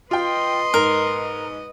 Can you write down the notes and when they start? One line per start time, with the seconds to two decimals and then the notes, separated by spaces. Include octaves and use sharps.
0.11 F4 B4 D#5 G5 C6
0.74 G#2 A#4